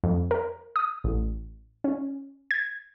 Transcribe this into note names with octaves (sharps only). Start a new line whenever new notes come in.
F2
A#4
D#6
A1
C#4
G#6